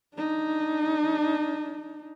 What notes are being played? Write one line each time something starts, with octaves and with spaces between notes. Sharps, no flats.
D4 D#4